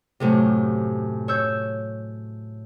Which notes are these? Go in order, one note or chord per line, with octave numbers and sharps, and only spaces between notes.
F#2 A2 C3
C#5 E6 G6